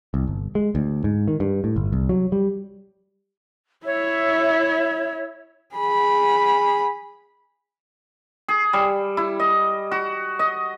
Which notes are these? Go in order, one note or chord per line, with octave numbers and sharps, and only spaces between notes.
C2
G1
G#3
D2
G#2
D#3
G2
A2
G1
C2
F#3
G3
E4 C#5 E5
G#4 B5
G#4
G3
E4
D#5
F#4
D#5